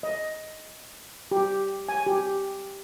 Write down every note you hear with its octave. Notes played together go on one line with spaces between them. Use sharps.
D#5
G4
G#5
G4